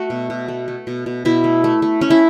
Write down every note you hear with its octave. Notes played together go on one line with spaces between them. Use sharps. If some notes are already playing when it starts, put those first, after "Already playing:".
Already playing: A3 F#4
B2
B2
A3
A3
B2
B2
B2 E4
A3
A3
A3
A3 C#4
E4